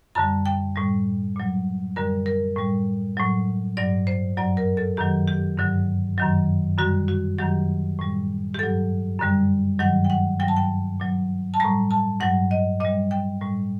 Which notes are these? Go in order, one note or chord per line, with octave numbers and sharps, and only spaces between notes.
F#2 D3 G3 A5
G5
A2 G3
A#2 F#3
F#2 D3 G3 A#4
A#4
A2 G3
A2 F#3
G2 F#3 D5
C5
F#2 F#3 D5
A#4
A4
F#2 D#3 F#3 G4
G4
G2 D3 F#3
F#2 D#3 F#3
F#2 D3 G3 F#4
F#4
F#2 D#3 F#3 G4
A2 G3
G4
G2 F#3 A4
F#2 D3 G3
G2 D#3 F#3 F#5
G5
F#5
G2 F#3 G5
A5
G5
A#2 F#3
A5
A2 G3 A#5
A5
G2 F#3 F#5
D#5
A#2 G3 D#5
G5
A2 G3